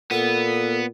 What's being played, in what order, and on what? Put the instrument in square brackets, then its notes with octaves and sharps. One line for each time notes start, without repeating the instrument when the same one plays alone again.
[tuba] A#2 [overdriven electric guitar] B3 [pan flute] A4